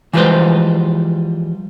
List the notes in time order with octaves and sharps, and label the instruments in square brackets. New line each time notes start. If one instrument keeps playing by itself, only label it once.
[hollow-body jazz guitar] E3 F3 G3 G#3 B4 C5